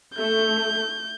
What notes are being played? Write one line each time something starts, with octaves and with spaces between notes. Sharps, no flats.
A3 G6